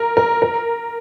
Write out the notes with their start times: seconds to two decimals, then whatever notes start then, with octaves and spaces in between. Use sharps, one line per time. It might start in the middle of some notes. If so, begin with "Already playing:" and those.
Already playing: A#4
0.17 A#4
0.42 A#4